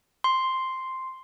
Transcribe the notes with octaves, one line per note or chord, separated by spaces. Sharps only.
C6